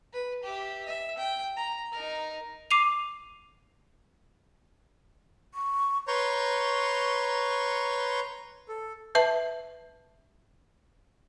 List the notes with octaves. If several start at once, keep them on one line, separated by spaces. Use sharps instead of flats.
B4
G4 E5
E5
G5
A#5
D#4 A#4
D6 C7 D#7 F7
C#6
B4 C#5 A#5 C6 C#6 G6
A4
B4 E5 A5